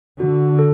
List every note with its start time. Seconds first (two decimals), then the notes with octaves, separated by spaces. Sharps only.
0.20 D3 F#4
0.59 A4